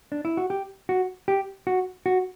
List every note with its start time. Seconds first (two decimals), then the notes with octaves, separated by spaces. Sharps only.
0.12 D4
0.25 E4
0.37 F#4
0.50 G4
0.89 F#4
1.28 G4
1.67 F#4
2.06 F#4